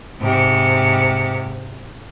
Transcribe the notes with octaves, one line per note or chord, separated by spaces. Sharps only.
G#2 C3